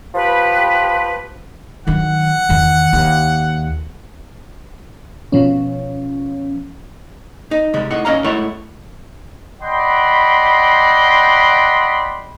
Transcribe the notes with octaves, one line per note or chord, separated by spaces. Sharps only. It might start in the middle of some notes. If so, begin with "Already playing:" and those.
F3 G4 B4
D#3 F#3 F#5
E2 D#3
D#2
B2 F3 C#4
D#4
C3 G3 G#3
A2 D#4 F#5
B1 F#2 C#4 D#5 F5 A#5
G#3 A3 E4 C#5 E5 F#5
D5 D#5 F#5 G5 B5 C6